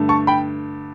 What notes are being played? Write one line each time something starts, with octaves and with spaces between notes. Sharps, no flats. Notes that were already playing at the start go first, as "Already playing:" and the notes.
Already playing: G2 D3 A3
A5 C#6
G5 B5